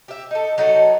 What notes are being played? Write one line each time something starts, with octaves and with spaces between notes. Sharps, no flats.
G4 E5
D#4 A4
F#3 D#4 F#4 A4